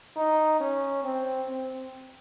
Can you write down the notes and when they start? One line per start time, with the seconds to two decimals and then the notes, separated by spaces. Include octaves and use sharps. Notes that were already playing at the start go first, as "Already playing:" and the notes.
0.16 D#4
0.60 C#4
1.04 C4
1.48 C4